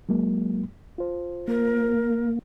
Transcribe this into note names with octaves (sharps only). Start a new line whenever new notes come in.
F#3 G#3 A#3
F4 C5
A#3 A#4